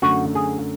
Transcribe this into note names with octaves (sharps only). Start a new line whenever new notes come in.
F#2 D3 A3 F#4
G#4